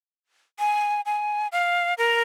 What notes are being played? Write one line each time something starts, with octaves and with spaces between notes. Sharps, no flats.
G#5
G#5
F5
A#4